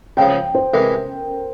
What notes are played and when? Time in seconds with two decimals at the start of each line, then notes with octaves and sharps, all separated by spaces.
0.17 C#2 C#3 F3 G5
0.55 C5
0.73 C3 E3 G#3 A#4